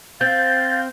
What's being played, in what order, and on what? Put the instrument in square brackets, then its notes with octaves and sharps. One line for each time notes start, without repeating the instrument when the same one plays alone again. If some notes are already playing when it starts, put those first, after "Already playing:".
[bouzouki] C4 [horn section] F5 [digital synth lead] G6 [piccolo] A6